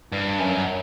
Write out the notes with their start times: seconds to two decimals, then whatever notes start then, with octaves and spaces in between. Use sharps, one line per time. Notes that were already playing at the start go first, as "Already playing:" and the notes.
0.12 G2
0.39 F#2